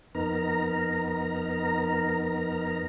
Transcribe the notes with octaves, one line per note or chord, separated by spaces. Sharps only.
F2 B3 D#4 A#4 A#5